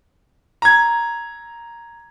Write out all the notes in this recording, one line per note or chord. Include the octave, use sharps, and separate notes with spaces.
A#5 G#6